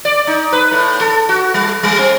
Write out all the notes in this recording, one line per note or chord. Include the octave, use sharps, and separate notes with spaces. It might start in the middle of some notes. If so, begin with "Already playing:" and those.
D5
D#4
B4
A2
A4
F#4
G3
G3
C4